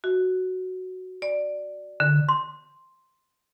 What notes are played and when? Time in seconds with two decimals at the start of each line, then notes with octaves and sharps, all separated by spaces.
0.04 F#4
1.22 D5
2.00 D3
2.29 C6